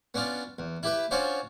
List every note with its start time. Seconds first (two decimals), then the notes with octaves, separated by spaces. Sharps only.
0.14 B3 C#4 D4 F4
0.59 E2
0.83 E4 G4 B4
1.11 C#4 D4 F4 F#4 C5 C#5